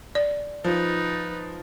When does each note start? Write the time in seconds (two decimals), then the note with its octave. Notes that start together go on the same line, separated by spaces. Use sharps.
0.15 D5
0.65 F3 D#4 B4